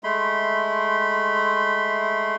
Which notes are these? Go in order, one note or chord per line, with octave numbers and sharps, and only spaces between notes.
G#3 A3 B5 C6